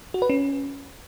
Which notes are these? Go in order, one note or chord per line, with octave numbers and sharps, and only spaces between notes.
F#4
B4
C#4